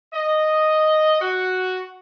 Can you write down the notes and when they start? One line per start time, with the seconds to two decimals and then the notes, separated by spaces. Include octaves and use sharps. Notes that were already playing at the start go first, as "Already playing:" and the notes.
0.14 D#5
1.21 F#4